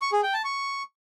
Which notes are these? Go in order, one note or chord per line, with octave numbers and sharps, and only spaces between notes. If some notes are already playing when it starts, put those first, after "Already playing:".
C#6
G#4
G5
A5
C#6